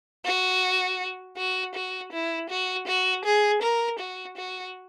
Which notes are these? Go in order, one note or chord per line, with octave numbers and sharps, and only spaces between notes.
F#4
F#4
F#4
E4
F#4
F#4
G#4
A#4
F#4
F#4